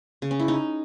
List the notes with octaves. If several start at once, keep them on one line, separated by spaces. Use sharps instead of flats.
C#3
C#4
E4
D#4